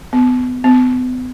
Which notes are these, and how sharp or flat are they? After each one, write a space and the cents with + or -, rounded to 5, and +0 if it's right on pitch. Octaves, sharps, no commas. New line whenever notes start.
B3 +30
B3 +40